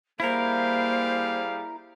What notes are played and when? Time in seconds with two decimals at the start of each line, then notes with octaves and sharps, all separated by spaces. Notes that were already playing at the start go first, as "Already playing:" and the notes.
0.20 G3 A#3 E4 G#4 A#4 C5 F5